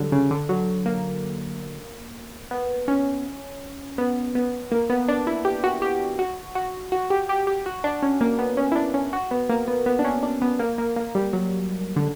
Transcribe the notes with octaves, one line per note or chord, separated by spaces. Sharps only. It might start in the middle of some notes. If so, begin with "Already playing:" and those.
Already playing: D3 F#3 G3
C#3
D3
F#3
A#3
B3
C#4
B3
B3
A#3
B3
D4
E4
G4
F#4
G4
F#4
F#4
F#4
G4
G4
G4
F#4
D4
C#4
A#3
B3
C#4
E4
D4
C#4
F#4
B3
A#3
B3
B3
D4
C#4
D4
B3
A#3
A#3
A#3
G3
F#3
D3